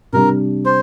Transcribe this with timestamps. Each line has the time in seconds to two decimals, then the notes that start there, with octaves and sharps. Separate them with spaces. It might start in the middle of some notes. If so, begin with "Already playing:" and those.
0.13 C3 G3 D4 A#4
0.65 C5